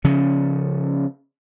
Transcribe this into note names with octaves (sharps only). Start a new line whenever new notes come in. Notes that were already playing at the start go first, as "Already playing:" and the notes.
C#3 F3 C#4